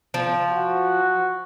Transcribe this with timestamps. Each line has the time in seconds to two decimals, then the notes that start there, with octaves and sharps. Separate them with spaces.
0.14 F3
0.51 F#4